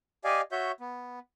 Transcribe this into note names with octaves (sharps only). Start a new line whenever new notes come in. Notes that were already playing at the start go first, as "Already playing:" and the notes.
G4 D5 D#5 F5 G#5
F#4 C#5 E5 G6
B3